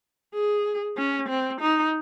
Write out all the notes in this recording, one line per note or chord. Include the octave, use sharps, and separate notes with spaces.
G#4
C#4
C4
D#4